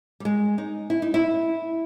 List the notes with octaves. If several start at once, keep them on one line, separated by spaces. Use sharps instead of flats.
G3
G#3
D#4
E4
D#4
E4